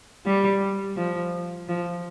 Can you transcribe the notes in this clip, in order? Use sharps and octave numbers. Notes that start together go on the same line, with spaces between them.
G3
F3
F3